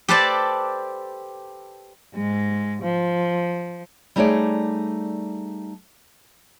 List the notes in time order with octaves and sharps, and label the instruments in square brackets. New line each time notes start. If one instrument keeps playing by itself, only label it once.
[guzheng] G4 A4 B4 C5 D5 A5
[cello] G#2 G#3
F3
[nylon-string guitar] G3 A3 D#4 G#4 C#5 D5